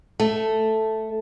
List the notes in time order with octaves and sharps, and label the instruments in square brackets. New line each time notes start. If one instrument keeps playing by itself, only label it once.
[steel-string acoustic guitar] A3